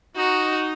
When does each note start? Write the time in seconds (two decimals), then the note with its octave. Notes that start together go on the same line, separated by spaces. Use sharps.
0.16 D#4 F#4